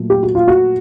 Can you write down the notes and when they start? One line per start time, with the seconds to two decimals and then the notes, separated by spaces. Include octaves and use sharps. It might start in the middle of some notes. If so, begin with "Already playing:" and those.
Already playing: A#2 F#3 A3
0.10 G4
0.23 F#4
0.35 F4
0.48 F#4